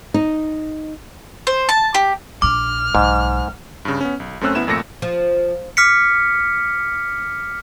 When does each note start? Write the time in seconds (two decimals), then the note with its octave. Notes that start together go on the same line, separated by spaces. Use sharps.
0.14 D#4
1.47 C5
1.69 A5
1.94 G4
2.42 A#1 D4 D6 F6
2.95 B1 G#2
3.85 G2 C#3
4.01 B3 C#4
4.20 B1
4.41 F#2 A3 C4 C#4 E6 F#6
4.55 A1 B3 E4 E7
4.67 G#1 F2 A#2 A3 A#6 C#7
5.02 F3
5.77 D6 F6 B6 C#7